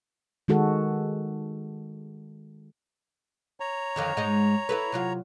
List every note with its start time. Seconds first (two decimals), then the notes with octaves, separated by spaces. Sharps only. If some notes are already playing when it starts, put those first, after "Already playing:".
0.48 D#3 G#3 F#4 A4
3.60 C#5 A#5
3.96 F2 D3 D#3
4.17 G#2 G#3 D#4
4.69 E4 A4 B4
4.92 C3 F#3 F4